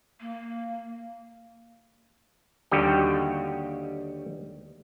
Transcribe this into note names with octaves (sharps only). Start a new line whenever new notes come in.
A#3
D#2 D3 G3 F#4 G4 D#5